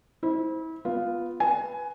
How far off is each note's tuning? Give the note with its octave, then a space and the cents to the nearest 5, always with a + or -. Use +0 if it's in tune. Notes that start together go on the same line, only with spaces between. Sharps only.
E4 -35 C5 +0
B3 +0 F4 +0
B4 +0 G#5 +15